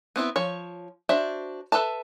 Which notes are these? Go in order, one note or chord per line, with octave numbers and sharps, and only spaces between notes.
B3 C4 E4
F3 C#5
D4 F#4 C5 E5
A4 B4 E5 A5